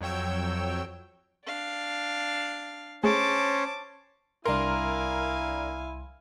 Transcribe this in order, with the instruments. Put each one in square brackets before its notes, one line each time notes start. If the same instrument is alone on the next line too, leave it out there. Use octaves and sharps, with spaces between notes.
[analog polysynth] F2 F#3 C#5 G5 E6
[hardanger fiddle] D4 F5
[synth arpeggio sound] A3 G#4 [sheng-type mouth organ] C#4 C5 C#5 [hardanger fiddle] A5 D6
[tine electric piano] C2 C6 [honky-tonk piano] D4 A#4 [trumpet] E4 [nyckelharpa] F5 G#5